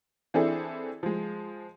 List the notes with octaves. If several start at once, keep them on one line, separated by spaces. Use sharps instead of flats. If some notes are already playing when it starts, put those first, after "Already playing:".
E3 C4 D4 E4 G#4 A4
F3 G#3